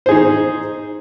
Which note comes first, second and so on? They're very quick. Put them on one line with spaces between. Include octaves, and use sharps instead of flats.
C5 G#4 D#4